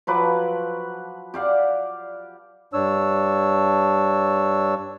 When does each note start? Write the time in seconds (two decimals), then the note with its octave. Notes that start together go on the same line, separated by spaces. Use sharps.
0.07 F3 F#3 B4 D6
1.34 G4 D5 F5 F#5
2.73 G2 D4 C#5 E6